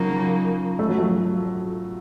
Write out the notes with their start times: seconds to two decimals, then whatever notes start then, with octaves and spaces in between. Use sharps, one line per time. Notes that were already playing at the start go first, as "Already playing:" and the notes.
Already playing: C#3 F3 F#3 A#3 D#4
0.79 A3
0.89 F#3
0.98 F3 A3